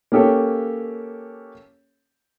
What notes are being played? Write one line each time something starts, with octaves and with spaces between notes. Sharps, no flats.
A#3 C#4 G4 A4 C#5